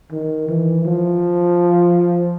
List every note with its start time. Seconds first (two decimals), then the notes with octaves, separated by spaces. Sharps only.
0.12 D#3
0.49 E3
0.85 F3